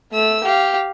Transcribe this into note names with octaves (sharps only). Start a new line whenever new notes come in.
A3 E6
G4 F5